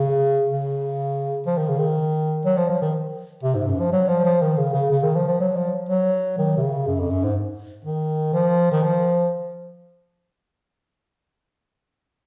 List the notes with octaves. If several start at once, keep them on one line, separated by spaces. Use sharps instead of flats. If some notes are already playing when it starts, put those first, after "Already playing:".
Already playing: C#3
C#3
F3
D#3
C#3
D#3
F#3
F3
F3
D#3
C3
G#2
F#2
F3
F#3
F3
F3
D#3
C#3
C#3
C#3
D#3
F3
F3
F#3
F3
F#3
D#3
C3
C#3
F#2
F2
F#2
G#2
D#3
F3
D#3
F3